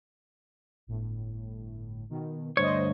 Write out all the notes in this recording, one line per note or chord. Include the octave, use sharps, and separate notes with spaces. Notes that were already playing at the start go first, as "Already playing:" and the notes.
G1 A2
B2 D#3
D2 G2 C5 C#5 D#5